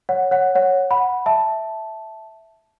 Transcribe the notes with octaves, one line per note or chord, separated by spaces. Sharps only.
C#5 F#5
C#5 F#5
C#5 F#5
F#5 B5
E5 A5